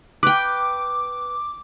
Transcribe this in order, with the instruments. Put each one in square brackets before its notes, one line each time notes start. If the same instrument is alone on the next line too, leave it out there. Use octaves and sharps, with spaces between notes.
[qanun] B4 G5 [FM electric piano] D6